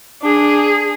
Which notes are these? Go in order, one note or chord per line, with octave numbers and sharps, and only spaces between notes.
D4 G#4